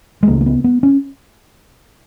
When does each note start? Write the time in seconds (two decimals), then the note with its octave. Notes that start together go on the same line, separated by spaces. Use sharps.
0.23 G#3
0.28 C#2 C#3 A#3
0.41 A#3
0.46 B3
0.64 B3
0.83 C#4